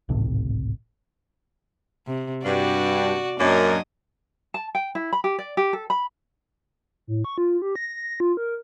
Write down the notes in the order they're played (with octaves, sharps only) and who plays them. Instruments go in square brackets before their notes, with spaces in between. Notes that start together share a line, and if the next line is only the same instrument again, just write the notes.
[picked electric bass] G#1 C#2 A2 C3
[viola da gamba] C3
[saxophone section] G2 [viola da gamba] F#4 D5
[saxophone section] F#2 A#3 [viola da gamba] F#3 D4 D#5
[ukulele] A5
G5
E4
B5
G4
D5
G4
A4
B5
[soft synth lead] A2
C#6
F4
G4
A#6
F4
A#4